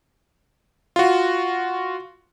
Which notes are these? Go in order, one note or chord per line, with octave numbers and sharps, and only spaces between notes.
F4 F#4